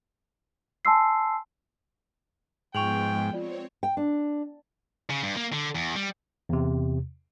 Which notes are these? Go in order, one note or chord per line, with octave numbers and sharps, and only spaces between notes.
G#5 A5 C6 E6 C7
G#2 F3 G#3 B3 G5 C#6 F7 F#7
C4 F4 C#5 D5
G5
D4
C#3
G2
A#3
D3
E2
G3
E2 C3